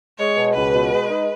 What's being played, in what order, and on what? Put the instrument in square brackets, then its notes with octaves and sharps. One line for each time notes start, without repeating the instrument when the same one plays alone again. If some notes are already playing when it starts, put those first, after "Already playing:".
[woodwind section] G#3 [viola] C#5
[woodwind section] B2
[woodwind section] C#2 [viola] B4
[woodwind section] B2
G#3
D#4